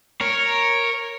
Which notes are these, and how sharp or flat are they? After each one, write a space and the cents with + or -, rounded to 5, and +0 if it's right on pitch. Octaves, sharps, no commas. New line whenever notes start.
A#4 +0 C#5 -5